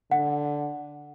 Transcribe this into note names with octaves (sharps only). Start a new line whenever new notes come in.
D3 F#5